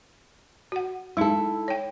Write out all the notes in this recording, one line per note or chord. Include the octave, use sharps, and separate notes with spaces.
F#4 F#5
G#3 D#4 E4 A4
C#5 G5